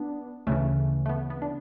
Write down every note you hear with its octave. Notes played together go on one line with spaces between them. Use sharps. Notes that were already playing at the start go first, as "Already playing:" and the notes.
Already playing: B3 D4
D2 C#3 E3 A3 C#4
A3
B3
B3
D4